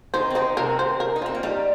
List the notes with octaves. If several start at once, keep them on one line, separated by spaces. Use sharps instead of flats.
D#3 D#4 C5
C4
D#3 D#4 C5
C3 C4 A#4
C5
A#4
D#4
C4 F4
A#3
G3 D#4